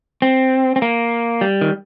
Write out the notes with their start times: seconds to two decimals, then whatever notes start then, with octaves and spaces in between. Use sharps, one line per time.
0.22 C4
0.76 C4
0.82 A#3
1.41 G3
1.61 D#3